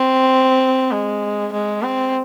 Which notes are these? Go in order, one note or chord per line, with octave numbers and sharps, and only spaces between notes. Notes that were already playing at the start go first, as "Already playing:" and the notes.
Already playing: C4
G#3
G#3
C4